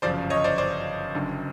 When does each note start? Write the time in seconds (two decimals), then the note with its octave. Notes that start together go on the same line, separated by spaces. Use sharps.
0.02 G1 F#2 C#3 F3 C5 D5
0.30 C#5 D#5
0.44 C5 D5
0.58 C5 D5
1.15 F#1 F#2 D3